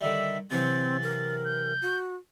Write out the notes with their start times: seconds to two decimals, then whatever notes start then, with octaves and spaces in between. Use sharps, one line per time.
0.01 D3 D#3 G3 E5
0.51 C3 E3 F#3 C4 A6
1.03 A#4
1.45 G6
1.82 F#4